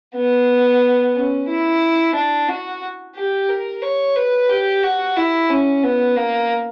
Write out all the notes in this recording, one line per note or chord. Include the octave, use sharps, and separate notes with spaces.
B3
C#4
E4
D4
F#4
G4
A#4
C#5
B4
G4
F#4
E4
C#4
B3
A#3